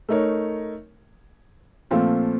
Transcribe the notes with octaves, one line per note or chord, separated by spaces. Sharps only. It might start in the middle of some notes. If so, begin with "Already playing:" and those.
A3 D#4 A#4 C#5
A#2 F3 A3 C4 F4